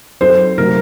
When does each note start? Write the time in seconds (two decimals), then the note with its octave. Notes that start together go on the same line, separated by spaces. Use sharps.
0.21 F#3 C4 D#4 A4 C5
0.58 C3 F#3 A3 D#4 F#4 A#4